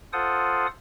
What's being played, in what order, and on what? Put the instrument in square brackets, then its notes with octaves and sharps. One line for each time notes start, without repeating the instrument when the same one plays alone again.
[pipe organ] F4 A4 C5 F#5 D#6